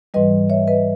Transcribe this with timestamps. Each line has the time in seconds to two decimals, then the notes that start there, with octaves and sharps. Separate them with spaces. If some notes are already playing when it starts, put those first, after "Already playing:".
0.14 G#2 E3 G3 B4 D#5
0.50 C#5 E5
0.67 B4 D#5